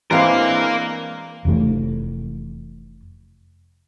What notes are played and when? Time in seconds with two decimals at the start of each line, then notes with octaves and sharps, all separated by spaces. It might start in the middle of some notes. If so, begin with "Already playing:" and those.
0.11 E3 G#3 A#3 C4 D4 A#4 F5
1.45 F1 F2 E3 A3